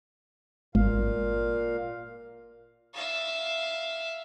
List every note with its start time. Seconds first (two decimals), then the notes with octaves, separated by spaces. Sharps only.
0.75 G#1 A#2 F5
2.94 E5 F5